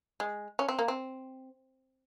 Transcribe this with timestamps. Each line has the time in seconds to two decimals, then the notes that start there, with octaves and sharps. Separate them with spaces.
0.20 G#3
0.59 C#4
0.69 C4
0.79 A#3
0.88 C4